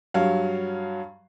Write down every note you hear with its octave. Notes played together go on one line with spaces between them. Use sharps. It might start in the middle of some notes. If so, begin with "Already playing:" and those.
G2 F#3 F5